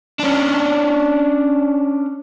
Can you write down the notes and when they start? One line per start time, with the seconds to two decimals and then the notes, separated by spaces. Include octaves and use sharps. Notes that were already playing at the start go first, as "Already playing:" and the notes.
0.20 C#4 D4